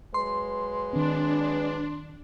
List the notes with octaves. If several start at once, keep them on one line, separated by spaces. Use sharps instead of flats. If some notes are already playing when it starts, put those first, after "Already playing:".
F#3 G#3 B4 C6
D#3 C4 D4